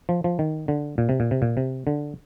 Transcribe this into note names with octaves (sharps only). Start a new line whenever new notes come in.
F3
F3
D#3
D3
A#2
C3
A#2
C3
A#2
C3
D3